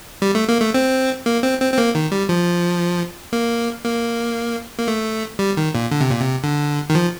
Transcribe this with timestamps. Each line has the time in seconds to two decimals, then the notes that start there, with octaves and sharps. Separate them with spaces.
0.22 G3
0.35 A3
0.49 A#3
0.61 A3
0.74 C4
1.26 A#3
1.43 C4
1.61 C4
1.73 C4
1.78 A#3
1.95 D#3
2.12 G3
2.29 F3
3.33 A#3
3.84 A#3
4.79 A#3
4.88 A3
5.39 G3
5.57 D#3
5.75 A#2
5.91 D3
6.01 C3
6.11 A#2
6.20 C3
6.44 D3
6.90 D#3
6.95 F3